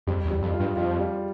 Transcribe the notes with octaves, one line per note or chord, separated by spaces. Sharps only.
F2 G3
E2
G3
F2
F4
G2
F2 F4
G3